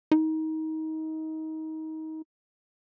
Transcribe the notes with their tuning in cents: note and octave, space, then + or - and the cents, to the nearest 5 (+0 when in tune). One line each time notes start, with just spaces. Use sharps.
D#4 +25